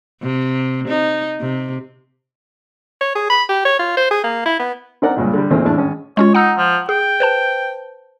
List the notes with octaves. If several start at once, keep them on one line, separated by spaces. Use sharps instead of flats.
C3
D#4
C3
C#5
G#4
B5
G4
C#5
F4
C5
G#4
A#3
E4
B3
C4 D#4 A#4 D5 F#5 A#5
C#2 G2 A#2
D3 G3
E2 A#2 D#3 A3 C4 C#4
E2 A2 D4 A5
G#1 C#4
G#3 C#4 F4 C#5
D#4 F#5 A#5 E6
F3
G#4 G5
B4 C5 A5